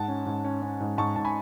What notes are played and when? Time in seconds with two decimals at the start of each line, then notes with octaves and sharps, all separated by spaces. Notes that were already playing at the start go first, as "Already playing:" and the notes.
Already playing: G#2 F#5 A5
0.08 C#4
0.26 G#2
0.44 C#4
0.62 C#4
0.80 G#2
0.98 G#2 A5 C#6
1.16 G#2 A5
1.25 G#5 B5